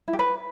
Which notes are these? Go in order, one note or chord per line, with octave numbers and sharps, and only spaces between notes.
E4
G4
B4